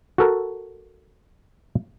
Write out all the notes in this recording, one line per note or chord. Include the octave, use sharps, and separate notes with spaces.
F#4 A4 A#4